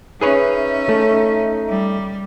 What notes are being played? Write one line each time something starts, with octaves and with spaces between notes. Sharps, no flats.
C#4 D#4 G#4 B4 C#5 E5
A3
G3